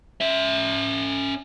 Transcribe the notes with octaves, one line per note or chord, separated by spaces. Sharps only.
C#4 E5